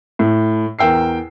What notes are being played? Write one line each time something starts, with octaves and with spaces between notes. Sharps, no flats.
A2
E2 A#4 G5 E6 C7